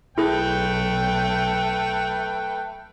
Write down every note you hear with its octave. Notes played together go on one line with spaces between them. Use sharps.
B1 A3 E4 G#4 B4 G5